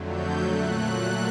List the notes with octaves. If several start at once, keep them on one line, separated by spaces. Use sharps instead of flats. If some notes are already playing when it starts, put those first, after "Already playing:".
Already playing: F2 D3 F#3 A3
G6
A#2 F#3 A3 F#6